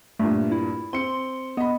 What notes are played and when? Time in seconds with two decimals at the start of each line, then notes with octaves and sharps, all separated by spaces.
0.19 G2 A#2 A3
0.52 E4
0.93 C4 C6 C#7
1.57 B3 D#5 B5